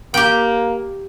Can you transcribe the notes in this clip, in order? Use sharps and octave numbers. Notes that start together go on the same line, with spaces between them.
A#3 G4 G5